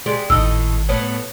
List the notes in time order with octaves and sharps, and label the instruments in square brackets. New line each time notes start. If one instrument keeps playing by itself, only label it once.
[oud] G#3 G4 D5
[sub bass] G#1 [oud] A2 D#4 [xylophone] E6
[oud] A2 B3 [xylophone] C#5